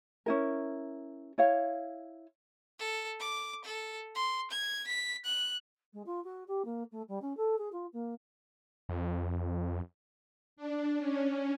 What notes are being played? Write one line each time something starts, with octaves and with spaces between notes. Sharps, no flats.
C#4 E4 A#4
E4 C#5 F5
A4
D6
A4
C6
G#6
B6
F#6
G#3
F4
F#4
G4
A#3
A3
G3
C#4
A4
G#4
F4
A#3
F2
D4
C#4